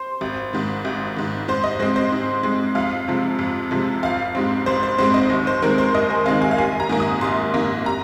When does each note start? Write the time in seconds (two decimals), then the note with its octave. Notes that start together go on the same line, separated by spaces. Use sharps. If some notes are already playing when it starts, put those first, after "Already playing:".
Already playing: C5
0.21 G#1
0.53 G#2 D#3
0.85 G#1
1.16 G#2 D#3
1.48 G#2 C5
1.64 D#5
1.80 G#3 C4 C5
1.96 C5
2.12 G#2
2.43 G#3 C4
2.75 F2 F5
3.08 C3 F3 G#3
3.39 F2
3.71 C3 F3 G#3
4.03 G#1 F5
4.35 G#2 G#3 C4
4.66 G#1 C5
4.83 C5
4.98 G#2 G#3 C4 C5
5.14 D#5
5.30 D#2
5.47 C5
5.62 D#3 G#3 C4 A#4
5.78 C5
5.95 D#2 D#5
6.10 G#5
6.26 D#3 G#3 C4 F5
6.42 G#5
6.51 F5
6.58 A#1 G#5
6.80 A#5
6.89 G#2 D#3 A#3
7.00 D#6
7.21 A#1 C6
7.54 G#2 D#3 A#3
7.86 A#5